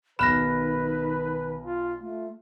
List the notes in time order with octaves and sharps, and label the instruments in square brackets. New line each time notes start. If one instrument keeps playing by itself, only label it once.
[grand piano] B1 F#6 E7 [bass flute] D#3 [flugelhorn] B4 [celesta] B5 F6 A#6
[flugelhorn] F4
[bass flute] A3 [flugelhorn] F4